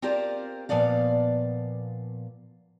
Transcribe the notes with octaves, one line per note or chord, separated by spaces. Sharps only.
C4 F4 G4 A#4 C5 D5
A#2 F3 B3 D5 F5